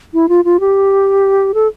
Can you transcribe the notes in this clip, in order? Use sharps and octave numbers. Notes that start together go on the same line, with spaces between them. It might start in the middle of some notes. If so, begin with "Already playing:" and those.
E4
F4
F4
G4
A4